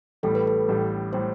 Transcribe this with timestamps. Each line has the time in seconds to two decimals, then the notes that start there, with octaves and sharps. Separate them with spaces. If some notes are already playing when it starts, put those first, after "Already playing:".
0.23 A1 A2 G3 A4
0.35 B4
0.47 A4
0.68 A1 A2 G3
1.13 A2 G3 C5